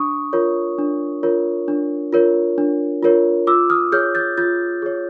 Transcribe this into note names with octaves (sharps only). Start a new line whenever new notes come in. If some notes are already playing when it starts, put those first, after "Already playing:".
Already playing: D4 C#6 D#6
F4 A#4 C#5
D4
F4 A#4 C#5
D4
F4 A#4 C#5
D4
F4 A#4 C#5
F4 D6 E6
D#6 F6
G#4 C#5 F6 G6
G6 A6
F4 G6 A6
G#4 C#5